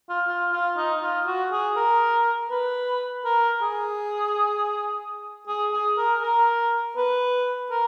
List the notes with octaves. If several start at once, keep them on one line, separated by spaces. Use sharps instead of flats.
F4
F4
F4
D#4
F4
F#4
G#4
A#4
B4
A#4
G#4
G#4
G#4
A#4
A#4
B4
A#4